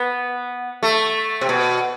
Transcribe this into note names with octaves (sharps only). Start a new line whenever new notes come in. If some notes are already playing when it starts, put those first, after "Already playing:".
Already playing: B3
A3
C3
B2